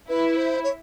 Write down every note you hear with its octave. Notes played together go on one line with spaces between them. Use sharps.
E4 B4
C5
C#5